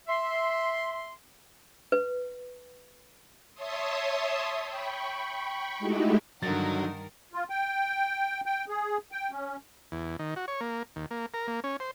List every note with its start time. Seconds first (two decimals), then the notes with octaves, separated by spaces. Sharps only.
0.08 E5 C6
1.92 B4
3.54 C#5 E5 A5 C6 D#6
4.63 G5 B5 C#6
5.79 G#3 A3 D#4 E4 F#4 G4
6.43 G2 D3 D#3 F#3 D#4 A#4 A6
7.34 F4
7.50 G5
8.46 G5
8.69 G#4
9.12 G5
9.31 C#4
9.92 E2
10.19 D#3
10.36 F#4
10.48 C#5
10.61 A#3
10.96 D#2
11.11 A#3
11.34 A#4
11.47 A#3
11.64 C#4
11.80 C5